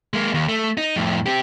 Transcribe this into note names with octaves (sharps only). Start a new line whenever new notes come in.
G#3 A#3
D#2
A3
D#4
F2 A2
C4 G4